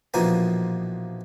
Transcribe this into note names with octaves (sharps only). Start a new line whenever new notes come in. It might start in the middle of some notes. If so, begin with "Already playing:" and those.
A#1 B2 E3 F3 A#3 G#5